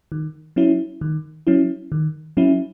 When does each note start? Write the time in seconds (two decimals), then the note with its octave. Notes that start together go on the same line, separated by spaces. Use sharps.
0.12 D#3
0.56 F#3 C#4 E4
1.01 D#3
1.47 F#3 C#4 E4
1.92 D#3
2.37 F#3 C#4 E4